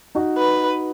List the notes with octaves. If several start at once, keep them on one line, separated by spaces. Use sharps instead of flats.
D#4 F#4
B4